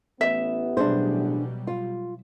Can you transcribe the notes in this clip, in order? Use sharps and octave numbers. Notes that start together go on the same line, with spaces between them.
A1 B3 E5
B2 F#3 G3 D4 G#4 C5
F4